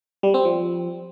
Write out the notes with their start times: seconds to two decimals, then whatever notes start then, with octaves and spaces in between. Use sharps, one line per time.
0.23 G3
0.34 C4
0.45 F3